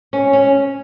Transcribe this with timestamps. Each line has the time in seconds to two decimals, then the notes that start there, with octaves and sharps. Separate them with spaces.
0.13 C#4
0.33 C#4